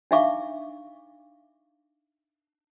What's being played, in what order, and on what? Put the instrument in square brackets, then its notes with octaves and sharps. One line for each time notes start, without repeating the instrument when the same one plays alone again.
[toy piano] D4 D#4 E5 F5 C#6 D6